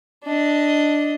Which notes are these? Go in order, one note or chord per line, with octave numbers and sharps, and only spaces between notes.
D4 D#5